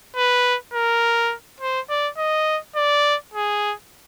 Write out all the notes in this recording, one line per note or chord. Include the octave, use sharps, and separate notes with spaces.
B4
A#4
C5
D5
D#5
D5
G#4